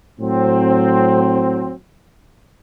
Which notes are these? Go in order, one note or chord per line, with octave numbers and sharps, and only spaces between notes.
A2 F#3 C4